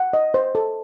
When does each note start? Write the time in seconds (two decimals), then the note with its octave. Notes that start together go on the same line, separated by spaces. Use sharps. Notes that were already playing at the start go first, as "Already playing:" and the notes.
Already playing: F#5
0.13 D#5
0.34 C5
0.55 A4